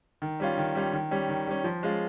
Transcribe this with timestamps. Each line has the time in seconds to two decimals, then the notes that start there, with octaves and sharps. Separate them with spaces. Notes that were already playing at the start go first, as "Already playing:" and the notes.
0.22 D#3
0.40 G3 C#4 F4
0.58 D#3
0.75 G3 C#4 F4
0.93 D#3
1.11 G3 C#4
1.29 D#3
1.47 G3 C#4
1.64 F3
1.83 G#3 C#4 F4